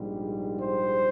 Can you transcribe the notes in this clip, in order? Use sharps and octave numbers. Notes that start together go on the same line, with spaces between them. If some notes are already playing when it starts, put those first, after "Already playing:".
Already playing: A#1 G#2 G3
C5